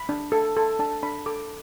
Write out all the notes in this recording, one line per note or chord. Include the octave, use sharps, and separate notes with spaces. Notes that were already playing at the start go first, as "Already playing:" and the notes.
Already playing: B5
D4
A4
A4
D4 A5
D4 B5
A4 D6